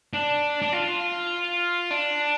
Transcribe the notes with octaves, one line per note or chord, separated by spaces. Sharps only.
D4
D4
F4
D4